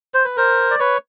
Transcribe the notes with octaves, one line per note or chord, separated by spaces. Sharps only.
C5
B4
A#4 C5
D5
B4 C#5